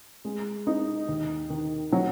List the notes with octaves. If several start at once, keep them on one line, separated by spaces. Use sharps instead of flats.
G#3
D#4
D#2
D#3
F#3